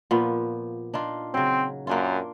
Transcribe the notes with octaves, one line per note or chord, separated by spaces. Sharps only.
A#2 F3 B3
D4 D#4 F4
C#3 F#3 C4
F#2 A#3 D4 F4